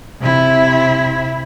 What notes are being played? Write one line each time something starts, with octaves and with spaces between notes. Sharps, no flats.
C3 E4